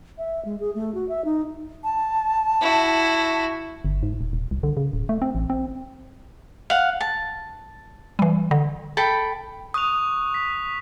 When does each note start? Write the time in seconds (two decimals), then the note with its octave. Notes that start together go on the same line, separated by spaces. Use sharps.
0.18 E5
0.45 G#3
0.60 G#4
0.75 A3
0.94 F#4
1.09 E5
1.25 D#4
1.84 A5
2.61 E4 F#4
3.85 G1
4.03 G#2
4.21 D#1
4.33 D#1
4.51 C2
4.63 D3
4.77 C#3
4.93 D1
5.09 A3
5.22 C4
5.35 A1
5.50 C4
6.70 F5 F#5
7.01 A5
8.19 E3 G3
8.51 D3
8.97 A4 G5 B5
9.74 C#6 D#6 F#6 F7
10.34 B6